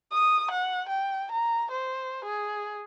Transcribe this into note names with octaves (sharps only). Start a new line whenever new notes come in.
D#6
F#5
G5
A#5
C5
G#4